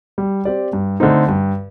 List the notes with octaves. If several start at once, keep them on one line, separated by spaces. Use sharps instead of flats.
G3
C4 G4 D5
G2
D3 A3 C4 D#4
G2